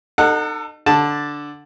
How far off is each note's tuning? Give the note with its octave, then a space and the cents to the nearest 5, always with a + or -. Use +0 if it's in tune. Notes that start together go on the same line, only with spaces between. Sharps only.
D#4 -30 A4 +30 F#5 -5
D3 +0 A5 +0